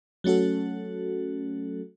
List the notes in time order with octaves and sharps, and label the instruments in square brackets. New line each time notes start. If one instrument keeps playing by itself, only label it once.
[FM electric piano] F#3 A3 C#4 F#4 A4